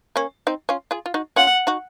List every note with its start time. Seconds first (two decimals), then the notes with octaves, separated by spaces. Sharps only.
0.16 A#3 C#4
0.47 C4 D#4
0.69 C#4 F4
0.91 F4 G#4
1.06 F4
1.14 D#4 F#4
1.36 C#4 F4 F#5
1.67 D#4 F#4